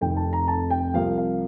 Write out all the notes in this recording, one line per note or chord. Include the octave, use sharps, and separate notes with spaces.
F1 F2 C3 D#3 G5
A5
A#5
A5
G5
C2 C3 F3 F5
F5